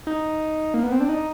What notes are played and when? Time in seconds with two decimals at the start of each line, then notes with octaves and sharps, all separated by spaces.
0.07 D#4
0.74 A#3
0.83 B3
0.92 C4
1.00 D4
1.09 D#4